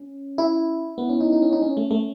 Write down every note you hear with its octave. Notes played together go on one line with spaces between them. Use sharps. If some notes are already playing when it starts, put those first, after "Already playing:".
Already playing: C#4
E4
B3
C#4
D#4
D#4
C#4
D#4
C#4
A3
A3